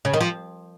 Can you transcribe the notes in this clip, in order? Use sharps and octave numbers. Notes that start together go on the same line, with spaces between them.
C#3
D#3
F3